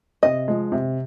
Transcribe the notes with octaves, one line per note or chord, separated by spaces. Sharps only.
C3 D#5
F3 G#3
C3